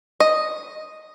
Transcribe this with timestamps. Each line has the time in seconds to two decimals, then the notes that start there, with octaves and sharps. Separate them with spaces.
0.20 D#5